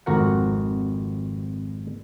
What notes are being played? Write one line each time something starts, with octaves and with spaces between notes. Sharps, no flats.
G#1 F2 F#4 A#4 F#5